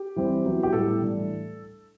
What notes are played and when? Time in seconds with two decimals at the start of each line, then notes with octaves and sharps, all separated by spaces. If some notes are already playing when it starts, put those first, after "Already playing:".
Already playing: G4
0.16 E3 G3 C4 E4
0.45 F#3 B3 E4
0.63 G4
0.73 A2 G3 B3 E4 A4
1.01 A2 E3 G3 D4